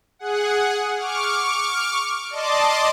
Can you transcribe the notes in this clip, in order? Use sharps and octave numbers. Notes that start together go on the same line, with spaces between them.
G#4 F#5
C#6 D6 F6
D5 D#5 A5 C6 D6